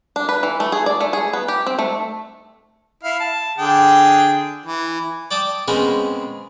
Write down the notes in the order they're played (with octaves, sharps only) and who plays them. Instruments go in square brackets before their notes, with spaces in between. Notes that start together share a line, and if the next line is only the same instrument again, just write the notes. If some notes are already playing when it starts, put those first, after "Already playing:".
[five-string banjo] D4
B4
E3
A3
G#4
D5
A3
G#4
B3
G4
C4
A3
[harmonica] E4 F5
A5
D3 G#4 G5
E3
[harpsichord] D5 G5 A5 D6 D#6
C#3 G#3 B3 C4 A#4 G5